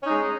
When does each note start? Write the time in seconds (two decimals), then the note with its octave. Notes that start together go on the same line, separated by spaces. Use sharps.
0.02 C#4
0.06 D#4
0.10 G#3